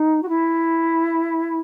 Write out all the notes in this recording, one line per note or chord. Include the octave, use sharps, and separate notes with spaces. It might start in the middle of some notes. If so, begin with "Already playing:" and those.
Already playing: D#4
F#4
E4